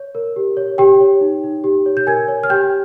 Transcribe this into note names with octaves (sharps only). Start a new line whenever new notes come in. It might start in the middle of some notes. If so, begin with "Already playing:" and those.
Already playing: C#5
A#4
G4
C#5
G4 G5
C#5
D#4
D#4
G4
C#5
G6
A#4 G#5 G#6
C#5
F6
G4 G5 G6